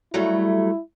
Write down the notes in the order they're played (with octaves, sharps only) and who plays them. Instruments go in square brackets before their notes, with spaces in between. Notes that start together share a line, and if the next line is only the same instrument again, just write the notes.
[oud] F#3 G3 A3 [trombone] E4